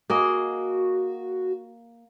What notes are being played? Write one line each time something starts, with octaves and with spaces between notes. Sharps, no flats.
A#3 F#4 G#4 D#5